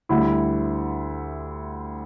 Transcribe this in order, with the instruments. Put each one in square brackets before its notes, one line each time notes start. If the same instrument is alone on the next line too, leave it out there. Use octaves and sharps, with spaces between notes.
[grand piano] D2 D3 G3 E4